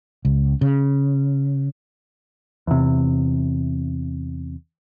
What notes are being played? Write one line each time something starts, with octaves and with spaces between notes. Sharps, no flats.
C#2
C#3
E2 C3